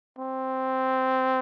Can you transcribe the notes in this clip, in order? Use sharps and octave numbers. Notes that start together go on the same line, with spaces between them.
C4